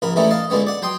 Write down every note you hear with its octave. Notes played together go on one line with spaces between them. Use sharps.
A#1 C#3 A#4 B5
E3 G3 A3 C#4 D#4 E4
D#5 F5 A5
A#2 D3 G#3 B3 C#4
D5 F#5
F#3 G5 C6 D#6